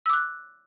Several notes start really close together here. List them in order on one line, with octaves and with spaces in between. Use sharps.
E6 D6 F#6